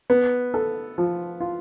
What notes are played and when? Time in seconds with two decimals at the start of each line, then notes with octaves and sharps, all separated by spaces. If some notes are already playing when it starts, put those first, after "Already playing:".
0.10 B3
0.54 A4
0.98 F3
1.40 F4